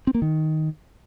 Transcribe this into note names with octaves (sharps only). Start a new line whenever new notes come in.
C4
A#3
D#3